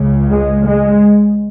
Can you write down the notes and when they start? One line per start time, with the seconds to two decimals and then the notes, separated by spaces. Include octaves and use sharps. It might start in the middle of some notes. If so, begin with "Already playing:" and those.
Already playing: C#2 C#3
0.30 G#3
0.67 G#3